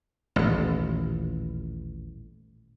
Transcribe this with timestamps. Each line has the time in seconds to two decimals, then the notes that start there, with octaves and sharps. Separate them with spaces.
0.36 D#1 A1